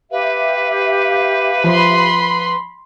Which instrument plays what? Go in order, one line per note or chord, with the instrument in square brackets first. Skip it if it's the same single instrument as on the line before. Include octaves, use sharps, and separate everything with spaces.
[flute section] G4 E5 F5 [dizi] B4
[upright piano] F3 [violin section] B5 C6